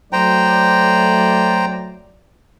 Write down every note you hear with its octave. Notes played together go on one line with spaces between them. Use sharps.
F#3 A3 C5 D5 G5 A#5